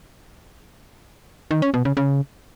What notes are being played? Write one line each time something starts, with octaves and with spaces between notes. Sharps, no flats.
D#3
C#4
B2
C#3
C#3